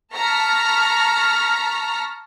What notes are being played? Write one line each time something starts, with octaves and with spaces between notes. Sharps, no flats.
A5 A#5 C#6 F6 A#6 B6